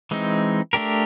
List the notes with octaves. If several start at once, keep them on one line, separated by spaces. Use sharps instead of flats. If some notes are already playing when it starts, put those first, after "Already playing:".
E3 G#3 C4 D#4
A3 D4 G4 A#4